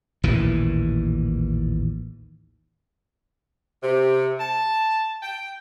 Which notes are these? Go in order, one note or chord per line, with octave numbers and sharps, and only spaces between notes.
A1 D#2 A#2 E3
C3
A5
G5